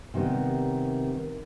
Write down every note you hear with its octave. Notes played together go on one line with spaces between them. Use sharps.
C3 D#3 G3 B3